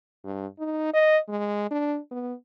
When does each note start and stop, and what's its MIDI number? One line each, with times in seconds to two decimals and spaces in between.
0.24 0.47 43
0.59 0.92 63
0.94 1.18 75
1.29 1.67 56
1.71 1.98 62
2.11 2.34 59